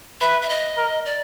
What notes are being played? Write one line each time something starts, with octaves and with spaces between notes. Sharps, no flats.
B4 E5
E5
D#5
A#4
D5